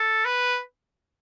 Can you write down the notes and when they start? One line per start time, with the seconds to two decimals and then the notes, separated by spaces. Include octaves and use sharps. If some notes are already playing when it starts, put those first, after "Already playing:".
Already playing: A4
0.25 B4